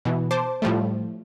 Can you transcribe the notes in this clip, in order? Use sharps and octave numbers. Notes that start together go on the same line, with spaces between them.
B2 E3
C5 A5 D6
A2 F3 G3 A3